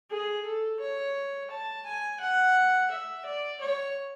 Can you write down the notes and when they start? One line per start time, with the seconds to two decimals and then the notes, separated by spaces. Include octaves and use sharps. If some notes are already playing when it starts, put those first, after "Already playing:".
0.10 G#4
0.46 A4
0.80 C#5
1.50 A5
1.85 G#5
2.20 F#5
2.91 E5
3.25 D5
3.61 C#5